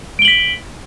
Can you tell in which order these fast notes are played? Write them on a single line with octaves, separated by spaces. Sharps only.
D7 G7 F#7 B6